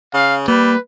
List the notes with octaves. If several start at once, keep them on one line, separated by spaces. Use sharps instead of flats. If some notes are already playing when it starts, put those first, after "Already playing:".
C#3 F5
G3 A#3 B4